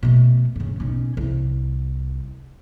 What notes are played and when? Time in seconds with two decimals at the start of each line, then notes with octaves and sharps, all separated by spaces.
0.03 B2 A3
0.56 G2 C#3
0.80 B1 C#4
1.17 C2